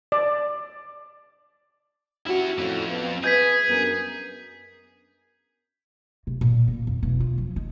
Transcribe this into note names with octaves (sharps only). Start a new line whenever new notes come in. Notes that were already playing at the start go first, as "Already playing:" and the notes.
D5
C#4 E4 F#4 G4 F#5
F2 A2
B3
G#4 B4 D#5 G6 G#6 B6
F#2 B3 D4 A#4
C3
A#2
A#3
F2
E1
F4
F3
G#3